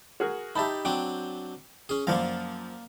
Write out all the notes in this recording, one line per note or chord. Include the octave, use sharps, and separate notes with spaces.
F#4 G#4 A#4
D#4 G4 E5 A5 B5
F#3 C4 D4 G5
C#4 G#4
F#2 F3 A#3 D5 F5